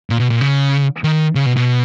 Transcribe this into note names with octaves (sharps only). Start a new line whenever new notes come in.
A#2
B2
A#2
C#3
D#3
C#3
B2
B2